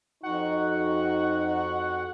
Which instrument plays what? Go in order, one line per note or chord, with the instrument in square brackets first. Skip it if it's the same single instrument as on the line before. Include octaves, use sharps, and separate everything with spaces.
[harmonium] F2 F#4 [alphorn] D#4 [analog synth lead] F#5